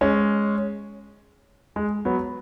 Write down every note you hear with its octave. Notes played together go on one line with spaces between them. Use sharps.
G#3 C#4
G#3
F#3 B3